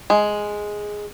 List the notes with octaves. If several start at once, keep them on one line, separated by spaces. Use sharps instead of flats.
G#3